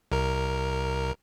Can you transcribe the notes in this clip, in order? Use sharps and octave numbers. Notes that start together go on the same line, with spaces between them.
C2 A#4